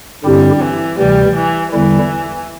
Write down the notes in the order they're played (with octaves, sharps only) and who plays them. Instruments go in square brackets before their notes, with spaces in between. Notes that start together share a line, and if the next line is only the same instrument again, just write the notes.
[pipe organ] G2 D3 C4 E4 G4 [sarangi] G3
[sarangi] E3
[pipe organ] D2 C3 E3 [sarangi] G3
[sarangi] E3
[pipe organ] E2 D3 G3 E4 [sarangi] E3